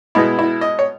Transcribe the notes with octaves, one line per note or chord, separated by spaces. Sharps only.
B2 G#3 B3 E4
E4
D#5
C#5